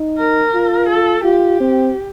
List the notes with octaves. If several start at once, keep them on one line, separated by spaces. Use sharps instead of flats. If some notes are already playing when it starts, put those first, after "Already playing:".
Already playing: D#4
A#4
F4
A4
F4 G4
C4